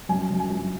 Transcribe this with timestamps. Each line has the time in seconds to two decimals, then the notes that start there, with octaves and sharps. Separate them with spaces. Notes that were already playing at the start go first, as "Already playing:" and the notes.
0.09 F#2 G#5
0.25 G#5
0.30 F#2
0.40 G#5
0.50 F#2